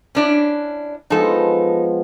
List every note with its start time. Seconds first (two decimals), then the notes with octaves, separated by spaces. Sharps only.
0.15 C#4 D4 E4
1.10 F3 G#3 B3 D#4 A4